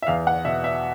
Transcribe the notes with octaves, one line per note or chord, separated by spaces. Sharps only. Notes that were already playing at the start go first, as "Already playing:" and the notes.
E5
E2 F5
F#5
B2 E5
E5